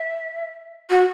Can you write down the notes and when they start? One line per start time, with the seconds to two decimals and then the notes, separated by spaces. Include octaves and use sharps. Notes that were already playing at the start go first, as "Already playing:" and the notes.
Already playing: E5
0.89 F#4